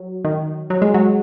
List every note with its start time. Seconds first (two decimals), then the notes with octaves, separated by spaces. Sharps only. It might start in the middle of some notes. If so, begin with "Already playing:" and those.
Already playing: F#3
0.25 D#3
0.70 F#3
0.82 G#3
0.94 F#3